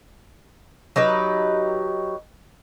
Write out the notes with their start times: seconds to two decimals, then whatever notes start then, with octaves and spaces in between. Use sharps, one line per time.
0.96 F#3 D#4 G4 B4